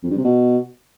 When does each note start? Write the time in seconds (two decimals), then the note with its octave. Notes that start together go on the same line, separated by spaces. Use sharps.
0.03 F2
0.10 G2
0.17 C3
0.24 B2